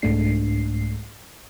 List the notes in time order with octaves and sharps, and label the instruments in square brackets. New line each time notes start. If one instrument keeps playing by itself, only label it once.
[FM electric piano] C2 G#2 G#3 A3 D4 C7